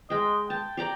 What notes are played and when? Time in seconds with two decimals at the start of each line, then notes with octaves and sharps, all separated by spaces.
0.10 G#3 D#5 G5
0.50 G5 A5
0.77 G4 D5 A#5